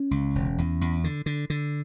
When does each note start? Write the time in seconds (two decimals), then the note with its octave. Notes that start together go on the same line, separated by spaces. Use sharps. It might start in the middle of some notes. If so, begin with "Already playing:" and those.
Already playing: C#4
0.11 C#2
0.35 E1
0.58 E2
0.81 E2
1.04 D3
1.26 D3
1.50 D3